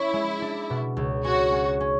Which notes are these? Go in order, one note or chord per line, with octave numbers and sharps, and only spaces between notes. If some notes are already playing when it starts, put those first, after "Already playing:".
Already playing: C#4 E4
G#3
D4
B2
C#2
C#4 F#4
C#4
C#4